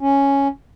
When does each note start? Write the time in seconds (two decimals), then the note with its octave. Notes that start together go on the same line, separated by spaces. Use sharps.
0.01 C#4